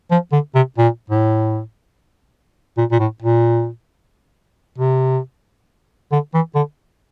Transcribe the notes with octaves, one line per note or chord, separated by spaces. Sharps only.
F3
D3
C3
A#2
A2
A#2
A#2
A2
A#2
C3
D3
E3
D3